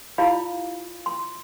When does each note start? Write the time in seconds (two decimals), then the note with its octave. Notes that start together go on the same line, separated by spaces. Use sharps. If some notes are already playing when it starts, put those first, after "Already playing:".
0.18 E4 F4 G4 D5 F5 B5
1.06 C6